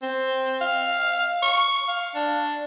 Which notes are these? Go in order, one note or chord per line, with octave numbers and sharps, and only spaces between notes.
C4
F5
C#6
F5
D4